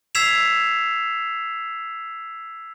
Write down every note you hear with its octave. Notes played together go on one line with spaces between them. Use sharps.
E6 G#6 B6 C7 E7 F7